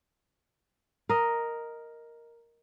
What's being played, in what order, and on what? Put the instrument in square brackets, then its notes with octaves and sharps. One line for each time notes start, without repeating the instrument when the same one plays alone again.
[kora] A#4 D#5